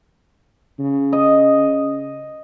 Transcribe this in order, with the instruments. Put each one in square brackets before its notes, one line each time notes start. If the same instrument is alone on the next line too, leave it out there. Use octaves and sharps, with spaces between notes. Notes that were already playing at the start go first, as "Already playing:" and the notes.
[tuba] C#3
[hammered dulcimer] D#5